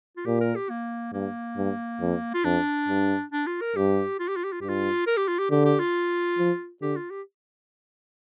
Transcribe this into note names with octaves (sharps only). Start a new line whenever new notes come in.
F4
A#2 G4
A#4
G4
A#3
G2 A#3
G2
F2
F4
F2 D4
G2
D4
F4
A#4
G2 G4
F4
G4
F4
G4
F4
G2 G4
F4
A#4
G4
F4
G4
D3 G4
G4
F4
F3
D3 G4
F4
G4